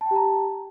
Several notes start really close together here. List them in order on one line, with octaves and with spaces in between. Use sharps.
A5 G5 G4 A#5